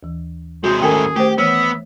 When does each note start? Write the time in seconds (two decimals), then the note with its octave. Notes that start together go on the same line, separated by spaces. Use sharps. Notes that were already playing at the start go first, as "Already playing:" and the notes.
0.03 D#2 E3
0.64 C3 G#3 F#4 C5
0.82 G#2 D#3 A3 C#4 G#4 A#4 G5 G#5
1.16 A3 G4 C5
1.38 E3 B3 C#5 E5 F6